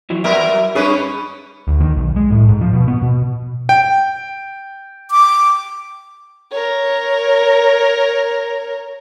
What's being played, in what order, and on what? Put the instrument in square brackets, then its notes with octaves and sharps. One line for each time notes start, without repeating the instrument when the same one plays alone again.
[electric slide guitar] F2 E3 F#3
[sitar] F#3 B3 A#4 [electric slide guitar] E5
[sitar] G2 C#4 B4 [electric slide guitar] G#4
[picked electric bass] D2
D#3
B1
G#3
A2
G#2
F3
B2
B3
B2
[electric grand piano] G5
[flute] D6
[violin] A#4 C#5